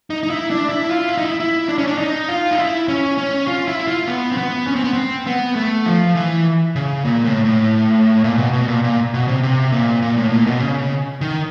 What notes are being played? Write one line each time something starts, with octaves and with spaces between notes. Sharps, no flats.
D#4
D#4
E4
D4
E4
F4
E4
D#4
E4
E4
D4
C#4
D4
D#4
F4
D#4
E4
C#4
C#4
F4
E4
F4
B3
C4
B3
C#4
C4
B3
C4
B3
A3
F3
E3
C#3
A#2
A2
A2
A#2
B2
B2
A#2
A#2
B2
C3
C3
A#2
A#2
A2
A#2
B2
C#3
D#3